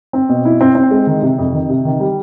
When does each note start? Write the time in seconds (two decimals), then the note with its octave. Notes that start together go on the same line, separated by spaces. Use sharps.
0.13 C4
0.29 B2
0.45 E4
0.61 C4
0.75 C4
0.91 G#3
1.07 D#3
1.22 C3
1.38 F2
1.53 D#3
1.69 C3
1.85 D#3
2.00 G3